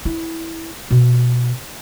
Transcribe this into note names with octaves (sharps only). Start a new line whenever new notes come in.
E4
B2